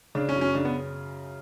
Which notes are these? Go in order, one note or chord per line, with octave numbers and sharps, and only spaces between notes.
C#3 D4
C#4
F#2
C#4
C#3 D4
B3